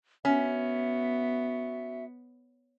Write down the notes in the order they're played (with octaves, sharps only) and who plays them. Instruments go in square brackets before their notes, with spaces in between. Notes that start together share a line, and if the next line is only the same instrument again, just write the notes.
[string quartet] B3 [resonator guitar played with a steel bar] C#4 [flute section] F#4 E5